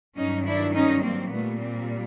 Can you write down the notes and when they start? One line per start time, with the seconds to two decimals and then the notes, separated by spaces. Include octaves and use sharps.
0.17 G2 D#3 F#3 C#4 D#4
0.46 D4 E4
0.75 C#4 D#4
1.03 A#3 C4
1.31 A#2 G3 A3 B3
1.60 A#3 C4